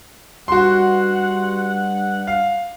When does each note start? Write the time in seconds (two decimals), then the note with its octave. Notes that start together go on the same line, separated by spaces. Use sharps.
0.48 G2 F#4 F#5 C6
2.27 F5